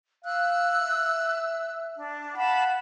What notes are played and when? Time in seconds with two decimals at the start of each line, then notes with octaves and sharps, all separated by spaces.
0.24 F5 E6 F#6
0.78 E5
1.96 D4
2.35 F5 F#5 A5 B5